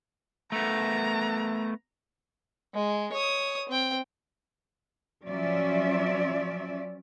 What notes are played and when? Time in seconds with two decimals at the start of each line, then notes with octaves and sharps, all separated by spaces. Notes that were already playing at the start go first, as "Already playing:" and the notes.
0.52 A3 B3 A#5
2.74 G#3
3.12 C#5 D#6
3.69 C4 G5
5.25 F3 F#3 C#4 D5 E5